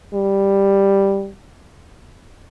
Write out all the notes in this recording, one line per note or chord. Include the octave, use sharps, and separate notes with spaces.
G3